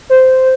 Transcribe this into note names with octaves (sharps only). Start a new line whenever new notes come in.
C5